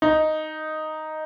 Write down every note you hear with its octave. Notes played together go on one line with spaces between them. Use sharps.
D#4